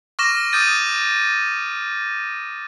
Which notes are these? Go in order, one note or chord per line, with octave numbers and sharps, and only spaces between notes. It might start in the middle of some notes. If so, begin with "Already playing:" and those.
C#6 D6 F6 A#6 E7
D6 D#6 G6 A6 D#7